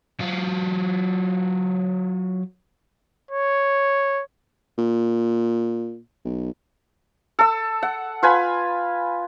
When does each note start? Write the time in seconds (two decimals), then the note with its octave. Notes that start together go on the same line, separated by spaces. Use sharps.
0.20 F#3 F4
3.31 C#5
4.78 A#2
6.25 B1
7.39 A4 E6
7.83 F#5
8.23 F4 B4 G#5 B5